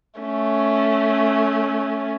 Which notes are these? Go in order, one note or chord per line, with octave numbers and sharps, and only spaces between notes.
A3 C#4